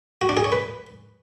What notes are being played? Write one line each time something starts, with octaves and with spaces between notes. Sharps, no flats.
F#4
D4
G#4
C#5
B4